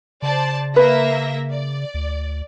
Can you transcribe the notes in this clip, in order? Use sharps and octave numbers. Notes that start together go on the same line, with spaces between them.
C#3 C5 D5 A5
A#3 B4 E5 A#6
D5
D2